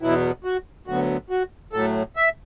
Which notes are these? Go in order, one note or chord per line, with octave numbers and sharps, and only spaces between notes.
E2 B2 F#3 B3 E4
F#4
D2 D3 F#3 B3 F#4
F#4
A2 F#3 A3 A4
E5